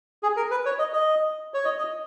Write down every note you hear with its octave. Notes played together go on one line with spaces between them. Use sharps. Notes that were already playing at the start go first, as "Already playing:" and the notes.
G#4
A#4
B4
C#5
D#5
D#5
C#5
D#5
D#5